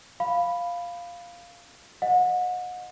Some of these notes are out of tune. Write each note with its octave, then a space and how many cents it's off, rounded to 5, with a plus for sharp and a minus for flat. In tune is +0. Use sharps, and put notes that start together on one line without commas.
F5 +0 B5 +0
D#5 +0 F#5 -35